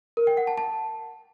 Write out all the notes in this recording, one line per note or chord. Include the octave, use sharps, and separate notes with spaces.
A#4
G5
F#5
A5
A5